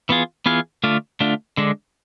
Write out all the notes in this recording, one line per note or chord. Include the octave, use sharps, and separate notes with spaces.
E3 B3 F4 G#4
E3 B3 F4 G#4
D3 A3 D4 F4
D3 A3 D4 F4
D3 G#3 D4